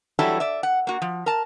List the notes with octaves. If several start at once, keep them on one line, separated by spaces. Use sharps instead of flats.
E3 F#3 G3 E4 F#4 A4
D5 E5
F#5
A#3 F#4
F3
A#4 A5